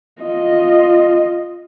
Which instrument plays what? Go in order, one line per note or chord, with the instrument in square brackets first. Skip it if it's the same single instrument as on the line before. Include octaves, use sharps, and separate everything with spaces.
[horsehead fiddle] F4 D#5